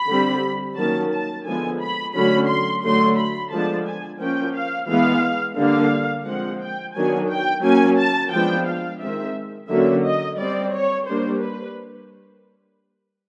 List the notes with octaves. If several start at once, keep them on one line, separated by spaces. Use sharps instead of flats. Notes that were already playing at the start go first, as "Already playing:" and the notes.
Already playing: B5
D3 G3 C4
D#3 F#3 A#3 C#4 A5
A5
D3 F3 G#3 B3 G#5
B5
D3 F#3 A3 C#4 B5
C6
D3 F#3 A3 C6
B5
D3 F3 G#3 B3 D4 A5
G#5
F3 A#3 C#4 G5
F5
E3 G#3 B3 F5
D3 G3 A#3 D4 F5
F3 G#3 C4 F#5
G5
D#3 F#3 B3 D4 G#5
G5
F#3 A#3 C#4 G#5
A5
F3 G#3 B3 D4 G5
F5
D#3 G#3 C4 E5
D3 F#3 A#3 C#4 E5
D#5
G3 C4 D5
C#5
G3 A#3 D4 C5
B4